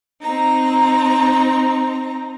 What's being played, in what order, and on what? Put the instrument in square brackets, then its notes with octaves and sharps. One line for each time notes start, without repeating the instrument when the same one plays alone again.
[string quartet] C4 D#4 A#5